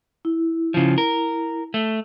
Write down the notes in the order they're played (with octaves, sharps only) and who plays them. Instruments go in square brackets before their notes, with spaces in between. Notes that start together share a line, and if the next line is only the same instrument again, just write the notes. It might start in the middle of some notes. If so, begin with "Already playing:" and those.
[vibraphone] E4
[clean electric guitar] C#3 F3
A#4
A3